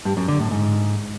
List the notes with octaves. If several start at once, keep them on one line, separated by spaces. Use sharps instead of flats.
G2
F#2
D3
A2
G#2